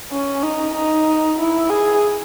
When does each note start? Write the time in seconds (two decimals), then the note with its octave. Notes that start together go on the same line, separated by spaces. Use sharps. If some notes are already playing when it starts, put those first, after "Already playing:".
0.12 C#4
0.43 D#4
0.74 D#4
1.38 E4
1.70 G#4